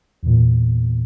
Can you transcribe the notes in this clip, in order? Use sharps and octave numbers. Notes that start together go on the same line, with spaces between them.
E2 A#2